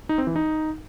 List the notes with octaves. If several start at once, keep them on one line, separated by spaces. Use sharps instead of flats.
D#4
C4
E3
D#4